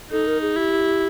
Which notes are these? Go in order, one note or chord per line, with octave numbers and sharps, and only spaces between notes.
D#4 A4
A#4
G#4
E4 G4